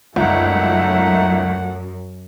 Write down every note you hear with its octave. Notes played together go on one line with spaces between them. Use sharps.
G1 C#2 F#2 A3 D#4 E5 F#5